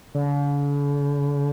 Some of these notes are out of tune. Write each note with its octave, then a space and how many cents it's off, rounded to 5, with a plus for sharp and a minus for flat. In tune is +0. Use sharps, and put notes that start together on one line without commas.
D3 -45